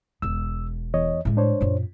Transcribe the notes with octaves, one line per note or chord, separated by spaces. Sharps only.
E1 B3 E6
E2 C#5 D#5
A2 G#3
D4 C5 C#5
F#2 A#2